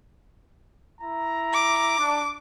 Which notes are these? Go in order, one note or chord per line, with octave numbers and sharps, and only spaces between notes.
E4 A#5
D6
D4